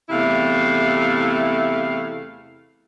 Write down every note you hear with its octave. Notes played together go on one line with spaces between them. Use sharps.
E2 C3 A3 E4 F5